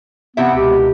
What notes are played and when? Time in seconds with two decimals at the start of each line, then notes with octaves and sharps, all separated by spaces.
0.37 C3 B3 E4 E5
0.55 C#2 B2 G4